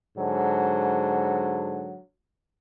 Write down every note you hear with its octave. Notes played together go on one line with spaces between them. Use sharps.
G#2 D3 F#3